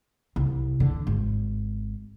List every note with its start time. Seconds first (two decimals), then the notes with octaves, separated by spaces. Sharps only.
0.36 C2
0.80 D3
1.07 G#1